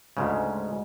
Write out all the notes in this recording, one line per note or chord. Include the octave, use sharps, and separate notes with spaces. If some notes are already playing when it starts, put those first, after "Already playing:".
D2 G#2 C#3 G#3